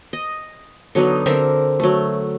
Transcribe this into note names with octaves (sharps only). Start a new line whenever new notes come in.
D#5
D3 F#3 B3 D#4
D3 C4 A#4 E5
F#3 A3